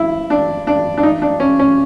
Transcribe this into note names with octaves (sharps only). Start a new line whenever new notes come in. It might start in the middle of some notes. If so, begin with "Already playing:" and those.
Already playing: E4
D4
D4
D4
D#4
D4
C#4
C#4